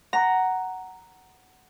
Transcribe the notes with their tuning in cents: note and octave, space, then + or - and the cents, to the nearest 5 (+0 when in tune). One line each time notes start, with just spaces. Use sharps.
F#5 +10 A#5 +0